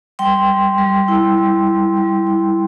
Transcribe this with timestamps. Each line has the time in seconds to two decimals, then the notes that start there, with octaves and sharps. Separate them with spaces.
0.19 G3 G5 C6
0.48 G3
0.78 G3
1.08 E4
1.38 G3
1.67 G3
1.97 G3
2.27 E4